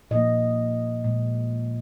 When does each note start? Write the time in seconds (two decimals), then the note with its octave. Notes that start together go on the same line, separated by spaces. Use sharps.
0.11 A#2 F3 A#3 D#5
1.04 A#2 G#3